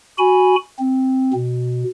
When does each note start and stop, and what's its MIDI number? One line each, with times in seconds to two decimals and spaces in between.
0.18 0.55 66
0.18 0.55 80
0.18 0.55 83
0.79 1.33 60
1.34 1.84 47